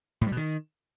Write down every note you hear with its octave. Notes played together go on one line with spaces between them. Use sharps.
A2
G3
B2
D#3